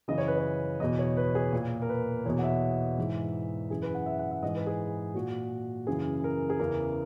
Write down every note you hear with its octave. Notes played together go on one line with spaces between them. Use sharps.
F#2 C#3 E3 D#5
C#5
B4
C#5
E2 B2 D#5
C#5
B4
G#4
A#2
A#4
B4
E2 B2 C#5
F#5
E5
G#2 E3
F#2 E3 G#4
B4
F#5
E5
F#5
E5
G#2 E3 D#5
B4
G#4
A#2 F#4
F#2 C#3 E3 G#4
A#4
G#4
E2 C#3 E3 A#4